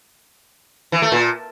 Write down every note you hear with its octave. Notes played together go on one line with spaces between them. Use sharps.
E3
A3
A#2